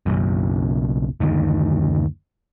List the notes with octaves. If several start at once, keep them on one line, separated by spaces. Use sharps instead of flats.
F#1 B1 F#2
F#1 D2 D#3